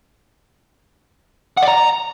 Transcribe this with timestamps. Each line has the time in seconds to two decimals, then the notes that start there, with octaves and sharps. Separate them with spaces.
1.57 F#5
1.63 D5
1.68 A#5